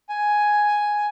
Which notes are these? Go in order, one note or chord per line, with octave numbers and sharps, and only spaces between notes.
G#5